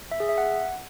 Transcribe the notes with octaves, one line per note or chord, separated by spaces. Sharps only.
E5
G#4
E5
F#5